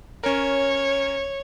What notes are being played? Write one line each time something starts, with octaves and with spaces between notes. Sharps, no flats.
C#4 A#4 C#5